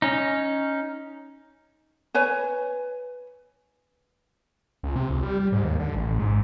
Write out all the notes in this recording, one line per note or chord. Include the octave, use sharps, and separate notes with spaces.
C#4 D#4
B4 C#5 G#5
C#2
C3
C#2
G3
G3
G#2
D#2
D3
A1
G#2